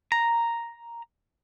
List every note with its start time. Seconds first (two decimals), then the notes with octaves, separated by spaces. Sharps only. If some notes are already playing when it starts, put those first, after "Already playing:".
0.12 A#5